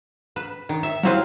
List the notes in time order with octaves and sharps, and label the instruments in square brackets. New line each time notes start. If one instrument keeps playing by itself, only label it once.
[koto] B4
D#3
E5
[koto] F#3 C4 B4 [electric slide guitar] G3 E4 F5